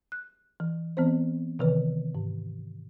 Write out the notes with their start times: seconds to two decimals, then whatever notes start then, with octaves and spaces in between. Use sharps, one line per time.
0.12 F#6
0.60 E3
0.97 E3 B3 C4 C5
1.59 C3 D#3 E3 B4
2.15 G#2